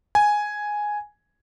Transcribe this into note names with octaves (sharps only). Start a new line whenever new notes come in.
G#5